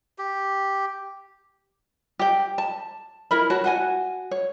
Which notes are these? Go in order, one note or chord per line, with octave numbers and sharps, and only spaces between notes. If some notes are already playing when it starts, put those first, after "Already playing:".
G4
G4 G5
A5
E4 A#4 B5
F#4 C#5 A5
F#4 F#5 G#5
C#5